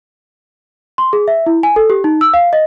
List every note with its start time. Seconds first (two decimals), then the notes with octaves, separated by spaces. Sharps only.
0.98 C6
1.13 G#4
1.28 E5
1.46 E4
1.63 G#5
1.76 A4
1.90 G4
2.04 D#4
2.21 E6
2.34 F5
2.53 D#5